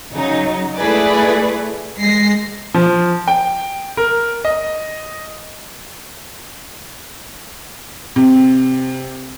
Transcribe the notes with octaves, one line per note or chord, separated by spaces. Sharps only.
C#3 F#3 D#4
A3 E4 G#4 B4 D5
G#3 A#6 C7
F3
G5
A#4
D#5
C3